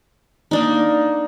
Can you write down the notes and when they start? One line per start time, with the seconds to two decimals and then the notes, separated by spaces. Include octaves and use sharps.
0.51 A#3 D4 D#4